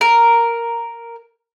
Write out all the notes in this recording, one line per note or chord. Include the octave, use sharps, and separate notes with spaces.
A#4